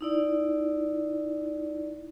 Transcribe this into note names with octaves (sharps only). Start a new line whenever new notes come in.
D#4 E4 D5